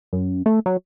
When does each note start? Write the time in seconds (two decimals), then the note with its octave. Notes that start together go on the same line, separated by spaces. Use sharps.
0.13 F#2
0.46 A3
0.66 F#3